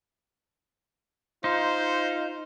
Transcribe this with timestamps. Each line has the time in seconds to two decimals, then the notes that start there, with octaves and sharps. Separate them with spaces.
1.44 D#4 F4 C5